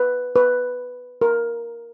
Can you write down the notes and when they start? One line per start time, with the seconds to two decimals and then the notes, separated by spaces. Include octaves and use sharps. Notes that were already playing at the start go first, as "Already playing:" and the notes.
Already playing: B4
0.36 B4
1.21 A#4